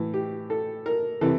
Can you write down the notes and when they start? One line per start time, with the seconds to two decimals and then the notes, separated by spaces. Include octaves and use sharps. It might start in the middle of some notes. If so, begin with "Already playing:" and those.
Already playing: A2 E3
0.14 G4
0.50 A4
0.86 A#4
1.21 C3 E3 A4